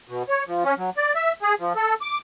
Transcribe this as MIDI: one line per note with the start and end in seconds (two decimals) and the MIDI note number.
0.08 0.23 47
0.28 0.44 73
0.47 0.64 53
0.64 0.74 61
0.78 0.90 54
0.97 1.13 74
1.15 1.33 76
1.42 1.54 68
1.60 1.73 53
1.76 1.94 69
2.02 2.18 86